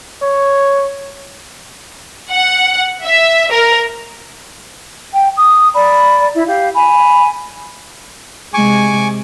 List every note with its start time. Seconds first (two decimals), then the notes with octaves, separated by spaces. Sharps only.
0.22 C#5
2.30 F#5
3.05 E5
3.51 A#4
5.11 G5
5.36 D#6
5.73 D5 A#5 B5
6.34 E4
6.46 G4 F5
6.73 G#5 B5
8.54 C3 G#3 G#5 C#6 D6